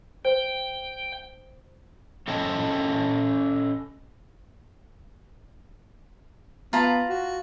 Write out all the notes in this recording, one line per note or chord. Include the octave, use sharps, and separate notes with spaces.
C5 G5
C#4 A4 D#5 G5 A5
B3 F4 A5 A#5
F#4